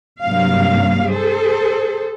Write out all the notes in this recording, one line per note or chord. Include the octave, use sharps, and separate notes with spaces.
G2 C3 F#3 A#3 F5
G#4 A4 C5